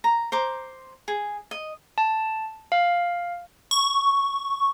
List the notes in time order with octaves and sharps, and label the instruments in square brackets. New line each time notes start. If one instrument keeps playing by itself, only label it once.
[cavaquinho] A#5
C5 A#5 D6
G#4
D#5
[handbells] A5
F5
[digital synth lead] C#6